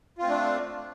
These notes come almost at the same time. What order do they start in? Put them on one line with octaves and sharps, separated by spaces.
F4 C4 A3 D4